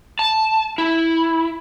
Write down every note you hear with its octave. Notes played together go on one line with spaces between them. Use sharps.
A5
E4